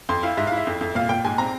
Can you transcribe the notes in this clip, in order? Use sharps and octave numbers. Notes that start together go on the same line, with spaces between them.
F2 C6
E4 F5
G#2 E5
E4 F5
E5
F2
F2
A#2 F5
A#2 G5
G#2 G#5
C4 A#5